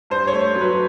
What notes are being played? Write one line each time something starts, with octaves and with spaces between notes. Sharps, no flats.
G2 C5
C#5
A3
F#3
B4